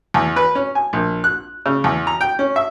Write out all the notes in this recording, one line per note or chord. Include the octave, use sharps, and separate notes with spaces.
E2
B4
C#4
G#5
A#1
F#6
C#3
E2
A#5
G5
C#4
E5